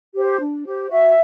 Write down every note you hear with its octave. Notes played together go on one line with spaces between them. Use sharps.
G4 C5
D4
G4 C5
F#4 E5